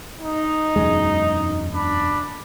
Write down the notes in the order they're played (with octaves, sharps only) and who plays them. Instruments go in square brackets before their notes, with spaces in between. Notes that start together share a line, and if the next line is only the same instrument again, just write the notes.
[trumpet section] D#4
[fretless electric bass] E1 F#2 G#3
[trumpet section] D4 B5